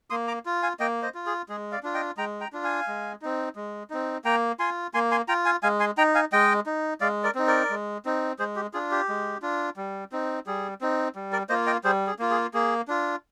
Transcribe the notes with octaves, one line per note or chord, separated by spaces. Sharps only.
A#3 C6 D#6
A#5 D6
F4
F5 G#5
A#3 D#5 G5
C5 D#5
F4
G#4
G#3 G#4
D5 F5
D4 F4
D#5 G5
G#3 G5 A#5
G5 A#5
D4 F4
F5 G#5
G#3
C4 D#4
G#3
C4 D#4
A#3 G5 A#5
F4 G#5 C6
A#3 G#5 C6
G#5 C6
F4 G5 A#5
F5 G#5
G#3 F5 G#5
G#5 C6
D#4 G5 A#5
F5 G#5
G#3 D#5 G5
D#4
G#3 D5 F5
A#4 D5
C4 D#4
A#4 D5
G#3
C4 D#4
G#3 G#4 C5
G4
D4 F4 G#4
G4
G#3
D4 F4
G3
C4 D#4
G3 G#4
C4 D#4
G3
A#4 D5
A#3 F4 C5 D#5
D#5 G5
G3 G#4 C5
G#4
A#3 F4
G#4
A#3 G#4
D4 F4